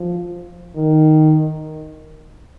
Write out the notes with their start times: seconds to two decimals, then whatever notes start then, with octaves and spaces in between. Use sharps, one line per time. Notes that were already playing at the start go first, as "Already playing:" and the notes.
Already playing: F3
0.76 D#3